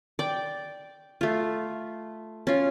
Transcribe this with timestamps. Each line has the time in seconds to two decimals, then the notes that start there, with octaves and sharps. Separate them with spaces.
0.19 D5 G5
1.21 A3 F4
2.47 C#4 F4